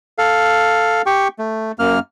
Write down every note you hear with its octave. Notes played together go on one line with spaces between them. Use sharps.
A4 F5
G4 G5 C#6
A3
F#2 A#3 F6